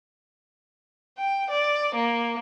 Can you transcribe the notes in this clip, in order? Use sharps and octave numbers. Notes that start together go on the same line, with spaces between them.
G5
D5
A#3